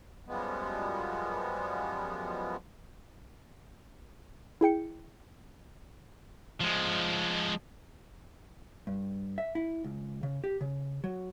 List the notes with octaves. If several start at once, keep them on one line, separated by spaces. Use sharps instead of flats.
F#2 F3 G3 G#3 B3
E4 G#4 G5 C#7
F3 G#3
G2
E5
E4
C#2
C#3
G4
C#3
F#3